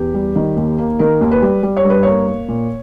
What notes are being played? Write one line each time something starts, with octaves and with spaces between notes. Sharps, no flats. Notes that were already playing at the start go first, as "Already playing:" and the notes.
Already playing: E2 G4
G3
D#3
D#2
A#3
D#3 A#4
D#2
B4
G3
G3
C#5
G2
B4
A#3 C#5
A#3
A#2